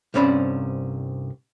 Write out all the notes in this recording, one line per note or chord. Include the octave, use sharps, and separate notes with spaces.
C2 G2 C4 C#4 D5 B5